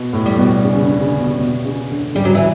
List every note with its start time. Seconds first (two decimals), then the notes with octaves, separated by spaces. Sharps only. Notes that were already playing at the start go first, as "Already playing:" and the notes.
Already playing: B2
0.13 A2
0.26 G3
0.38 B2
0.63 C#3
0.76 C#3
0.83 D3
1.01 C#3
1.20 B2
1.39 B2
1.65 C#3
1.90 D3
2.15 C#3 G3
2.25 F#3
2.35 E3